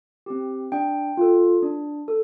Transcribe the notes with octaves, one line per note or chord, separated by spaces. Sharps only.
C4 G4
D4 G5
F4 A4
D4
A4